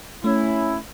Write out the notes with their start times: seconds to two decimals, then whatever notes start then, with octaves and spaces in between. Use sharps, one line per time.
0.24 A3 C#4 E4